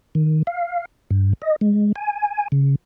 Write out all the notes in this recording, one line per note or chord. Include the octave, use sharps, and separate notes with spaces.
D#3
F5
G2
D#5
G#3
G#5
C#3